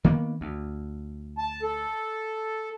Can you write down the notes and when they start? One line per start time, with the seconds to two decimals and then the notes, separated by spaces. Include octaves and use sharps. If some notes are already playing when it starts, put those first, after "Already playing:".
0.04 D#3 A#3 B3
0.41 D2
1.38 A5
1.63 A4